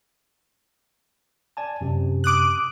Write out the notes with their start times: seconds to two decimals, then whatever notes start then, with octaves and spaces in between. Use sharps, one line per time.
1.57 D5 G#5 A5
1.81 F#2 C3
2.24 D6 D#6 F#6